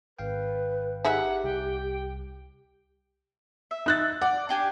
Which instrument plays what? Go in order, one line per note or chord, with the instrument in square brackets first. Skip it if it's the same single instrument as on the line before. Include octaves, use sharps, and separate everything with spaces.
[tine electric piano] G#1 F5 G5 [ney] B4
[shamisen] D#4 G#4 E5 [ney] G4 [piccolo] F#5
[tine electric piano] C2 [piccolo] G5
[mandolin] E5
[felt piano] D#4 F#6 A6
[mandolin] D5 [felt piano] F#5
[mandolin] D4 G4 G#5